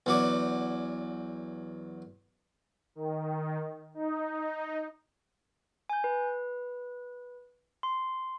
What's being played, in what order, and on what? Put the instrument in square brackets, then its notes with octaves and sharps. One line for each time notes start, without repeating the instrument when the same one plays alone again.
[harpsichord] E2 F#3 D5
[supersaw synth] D#3
D#4
[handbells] G#5 G6
B4
C6